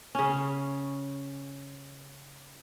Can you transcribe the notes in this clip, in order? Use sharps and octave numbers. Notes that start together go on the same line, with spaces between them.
C#3 C#4